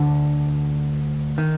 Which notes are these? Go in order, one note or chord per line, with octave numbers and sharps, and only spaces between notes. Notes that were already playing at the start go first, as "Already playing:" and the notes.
Already playing: D2 D3
D#3